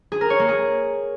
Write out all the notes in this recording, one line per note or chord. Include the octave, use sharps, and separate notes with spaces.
G#4
A#4
C#5
A#3
G#4